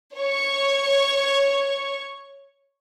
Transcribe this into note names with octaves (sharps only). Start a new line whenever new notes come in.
C#5 C#6